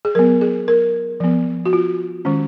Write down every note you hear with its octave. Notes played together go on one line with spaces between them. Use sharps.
G#4
F#3 B3 A#4
G#4
A#4
F3 B3
F#4
F4
D#3 G#3 C#4